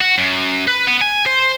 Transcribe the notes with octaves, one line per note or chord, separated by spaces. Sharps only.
F#4
F#2
B4
B3
G#5
C5